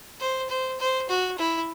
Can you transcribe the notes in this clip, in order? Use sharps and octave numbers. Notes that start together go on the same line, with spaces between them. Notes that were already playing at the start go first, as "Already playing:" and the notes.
C5
C5
C5
F#4
E4